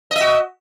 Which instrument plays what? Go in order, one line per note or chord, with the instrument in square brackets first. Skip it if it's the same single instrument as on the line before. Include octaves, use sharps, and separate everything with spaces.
[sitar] D#5
E5
F#4